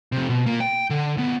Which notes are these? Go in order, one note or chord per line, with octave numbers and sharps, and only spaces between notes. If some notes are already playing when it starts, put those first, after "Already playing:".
F2 C3
B2
A#2 A#3
G5
D3
D2 B3